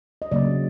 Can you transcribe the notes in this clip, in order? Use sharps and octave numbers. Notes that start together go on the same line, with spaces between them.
D#5
C#3 F#3 A#3 D5